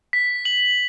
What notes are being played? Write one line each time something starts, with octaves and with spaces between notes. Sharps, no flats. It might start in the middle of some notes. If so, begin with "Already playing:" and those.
B6
F#7